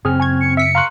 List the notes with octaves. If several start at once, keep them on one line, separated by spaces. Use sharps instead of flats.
F#2 C#3 C4 G#4 F6
G#5 C#6 G#6
C#7
E5 B6 C#7 D7
F5 A#5 C6 C#6 F#6